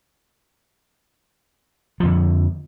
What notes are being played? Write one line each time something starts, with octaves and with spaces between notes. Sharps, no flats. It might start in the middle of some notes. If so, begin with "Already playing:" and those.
F2 D3 F3